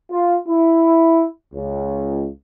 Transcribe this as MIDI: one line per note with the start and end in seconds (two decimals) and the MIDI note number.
0.11 0.36 65
0.47 1.25 64
1.54 2.29 37